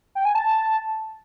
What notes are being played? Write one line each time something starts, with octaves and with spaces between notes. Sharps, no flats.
G5
G#5
A5